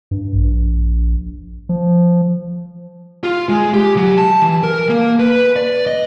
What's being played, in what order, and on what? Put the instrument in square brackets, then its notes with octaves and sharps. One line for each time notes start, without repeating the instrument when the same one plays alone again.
[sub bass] G2
A#1
F3
[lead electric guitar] F4
G#3
G4
F#3
A5
E3
A#4
A#3
B4
D5
D#5